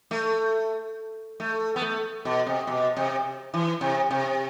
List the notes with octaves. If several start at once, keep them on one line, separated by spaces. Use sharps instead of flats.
A3
A3
B3
A3
B2
C3
B2
C3
E3
C3
C3